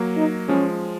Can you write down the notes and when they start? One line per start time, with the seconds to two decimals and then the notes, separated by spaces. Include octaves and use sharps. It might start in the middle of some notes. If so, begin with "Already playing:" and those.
Already playing: F#3 A#3
0.17 D#4
0.48 F3 G#3 C#4